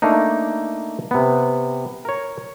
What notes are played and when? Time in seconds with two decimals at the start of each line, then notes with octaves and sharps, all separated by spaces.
0.02 A3 A#3 D4 D#4
1.11 C3 B3
2.05 A#4 C#5